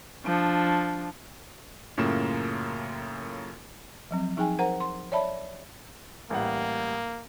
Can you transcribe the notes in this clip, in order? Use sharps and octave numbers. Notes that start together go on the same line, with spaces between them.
F3 D4
F#2 A2 C#3 A#3 F4 E7
F3 F#3 C4
F3 D#4 G#4 G5 G#5
A#4 C5 F#5 A#5
C6
C#5 D5 E5 A5 B5
A1 G3 A#3 F#5